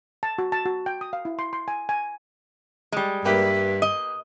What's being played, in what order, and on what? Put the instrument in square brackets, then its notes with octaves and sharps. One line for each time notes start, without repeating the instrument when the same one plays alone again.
[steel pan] A5
F#4
A5
F#4
G5
D#6
F5
E4
C6
C6
G#5
G#5
[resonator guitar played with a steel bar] G3 G#3
[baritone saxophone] G2 [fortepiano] A#3 G4 B4 [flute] E5
[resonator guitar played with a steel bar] D#5